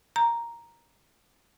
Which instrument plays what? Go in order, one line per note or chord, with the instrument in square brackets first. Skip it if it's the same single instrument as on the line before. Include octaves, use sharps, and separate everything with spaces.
[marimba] A#5